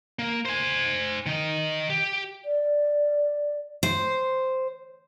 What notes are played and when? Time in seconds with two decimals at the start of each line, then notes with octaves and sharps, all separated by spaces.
0.19 A#3
0.45 C5 G#5
1.26 D#3 D#4
1.90 G4
2.45 D5
3.83 C5